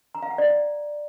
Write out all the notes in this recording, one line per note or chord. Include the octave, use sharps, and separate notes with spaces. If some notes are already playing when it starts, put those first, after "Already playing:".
A#5
F5
F#5
D5